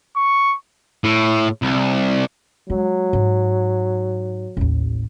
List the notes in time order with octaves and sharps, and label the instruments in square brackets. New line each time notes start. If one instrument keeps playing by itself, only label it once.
[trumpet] C#6
[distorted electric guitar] A2
C2
[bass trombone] F#3 [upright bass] G#3
[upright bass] G#2
A1 D#2